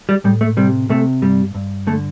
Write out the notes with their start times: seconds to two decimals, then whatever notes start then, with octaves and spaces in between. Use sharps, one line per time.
0.09 G3
0.24 A2 G3
0.41 A3
0.57 C3 G3
0.89 C3 A3
1.22 G2 G3
1.55 G2
1.87 D3 A3